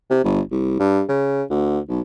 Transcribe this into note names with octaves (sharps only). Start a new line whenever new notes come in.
C3
G1
C2
G2
C#3
D2
B1